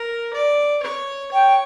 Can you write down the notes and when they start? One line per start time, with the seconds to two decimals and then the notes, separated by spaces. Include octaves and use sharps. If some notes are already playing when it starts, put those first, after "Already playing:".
Already playing: A#4
0.33 D5
0.83 C#5
1.31 C#5 G5